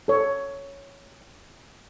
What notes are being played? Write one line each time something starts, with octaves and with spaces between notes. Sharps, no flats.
A4 C#5